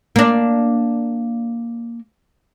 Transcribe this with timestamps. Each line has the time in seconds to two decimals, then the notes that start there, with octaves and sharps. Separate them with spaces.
0.16 A#3 D4